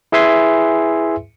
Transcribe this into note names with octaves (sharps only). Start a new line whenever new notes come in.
E4 G#4 B4 E5 G#5 C6